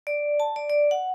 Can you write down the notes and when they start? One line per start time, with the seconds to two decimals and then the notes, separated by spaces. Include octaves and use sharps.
0.07 D5
0.40 A5
0.56 D5
0.70 D5
0.91 F#5